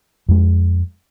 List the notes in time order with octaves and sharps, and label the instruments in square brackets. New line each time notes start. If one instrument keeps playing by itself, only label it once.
[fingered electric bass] F2 G#3